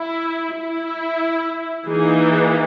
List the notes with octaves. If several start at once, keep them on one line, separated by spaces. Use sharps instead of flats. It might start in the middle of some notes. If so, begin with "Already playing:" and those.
Already playing: E4
E4
E3 A#3 D#4 G#4